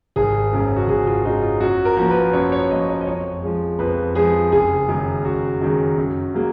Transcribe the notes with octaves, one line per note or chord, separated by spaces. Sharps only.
G#1 G#4
F#2 C#3 G#3
F#4
G#1 G#4
F4
F#2 C#3 G#3 D#4
F4
F#2 F#4
A#4
F3 A#3
B4
F#2 C#5
C#5
F3 A#3 D#5
C#5
D#5
F2 C#5
F3 G#3
F2 B4
F3 G#3 G#4
F#1 G#4
F#2 D#3 G#3
F#1 F#4
F#2 D#3 G#3
F#2
C#3 F#3 A#3